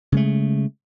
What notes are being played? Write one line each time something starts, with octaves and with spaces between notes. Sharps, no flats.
C#3 G#3 A3